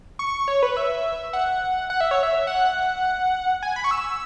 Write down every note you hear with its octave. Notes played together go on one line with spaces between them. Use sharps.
C#6
C#5
B4
E5
F#5
F#5
E5
C#5
E5
F#5
G#5
B5
C#6
E6